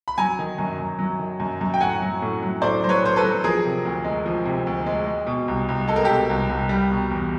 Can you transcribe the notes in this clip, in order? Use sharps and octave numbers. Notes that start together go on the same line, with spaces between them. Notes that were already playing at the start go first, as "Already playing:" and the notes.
B5
F#3 G#5 A#5
D#3
F#2
F#2
F#3
D#3
F#2
F#2
G5
A2 F#5 G#5
F#3
A2
F#3
A2 C5 D5
F#3 C5
B4 C#5
A2 C5
A4 B4
F#3
F3 G#4 A#4
C3
D2
G#3
F3
C3
D2
G#3
G#3
B2
C2
C2
G#3 A4
A#4
B2 G4 A4
C2
C2
G3
B2
E2